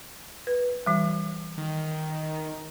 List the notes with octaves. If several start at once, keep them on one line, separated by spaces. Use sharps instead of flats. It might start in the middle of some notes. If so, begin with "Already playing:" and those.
B4
E3 G3
D#3